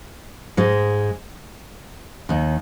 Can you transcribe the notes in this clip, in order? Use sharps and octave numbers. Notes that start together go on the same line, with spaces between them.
G#2 G#3
D#2 D#3